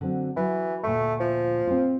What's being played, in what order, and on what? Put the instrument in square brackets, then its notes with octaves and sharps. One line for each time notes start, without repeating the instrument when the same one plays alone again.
[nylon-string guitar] D3 F#3 C4
[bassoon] E3 [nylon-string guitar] F#3
[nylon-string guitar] D2 A#2 [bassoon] A3
[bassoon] F3
[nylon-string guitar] C4 F4